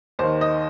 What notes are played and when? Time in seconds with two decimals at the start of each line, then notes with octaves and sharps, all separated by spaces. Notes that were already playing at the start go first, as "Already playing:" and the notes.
0.19 D#2 D#3 C5
0.41 D#5